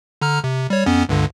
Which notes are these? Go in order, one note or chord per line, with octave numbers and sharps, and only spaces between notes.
D3 A#5 F6
C3
G3 C#5
F2 B3 C#4
C#2 G2 D3